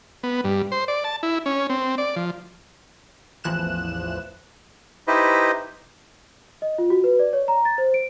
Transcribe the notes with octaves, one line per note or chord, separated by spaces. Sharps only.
B3
G2
C5
D5
A5
E4
C#4
C4
D5
F3
A1 E2 E3 F3 F#6 E7
D#4 E4 G4 B4 C5 D#5
D#5
F4
F#4
B4
D5
C#5
A#5
A6
C5
D7